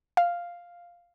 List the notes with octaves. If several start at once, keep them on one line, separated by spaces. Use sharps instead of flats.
F5